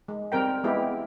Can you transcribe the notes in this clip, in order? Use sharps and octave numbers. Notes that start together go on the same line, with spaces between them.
G#3
G3 C4 A#4 G5
G#3 B3 E4 G4